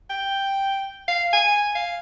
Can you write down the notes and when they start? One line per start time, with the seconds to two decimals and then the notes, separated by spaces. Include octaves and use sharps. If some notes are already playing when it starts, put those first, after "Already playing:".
0.10 G5
1.08 F5
1.33 G#5
1.75 F5